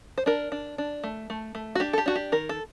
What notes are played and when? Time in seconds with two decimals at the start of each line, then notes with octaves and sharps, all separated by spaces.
0.18 C5
0.26 D4 A#4
0.52 D4
0.78 D4
1.04 A3
1.30 A3
1.55 A3
1.75 F#4
1.80 D4 G4
1.93 A4
1.98 G4
2.06 D4 F#4
2.16 G4
2.32 D#3 A#4
2.49 A4